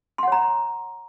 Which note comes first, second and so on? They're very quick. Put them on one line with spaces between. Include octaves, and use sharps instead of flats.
C6 F#5 C#5 A#5